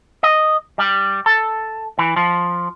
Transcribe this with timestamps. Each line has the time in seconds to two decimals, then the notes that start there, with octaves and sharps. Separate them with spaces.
0.23 D#5
0.78 G3
1.26 A4
1.99 E3
2.16 F3